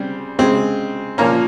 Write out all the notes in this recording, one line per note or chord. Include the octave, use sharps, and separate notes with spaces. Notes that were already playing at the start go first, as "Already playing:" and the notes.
Already playing: C#3 G3 C4
C#3 G#3 C4
A#2 F3 A#3 C#4 A#5